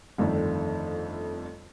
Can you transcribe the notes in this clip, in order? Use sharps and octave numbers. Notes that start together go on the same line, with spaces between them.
G1 F2 D#3 A3 D4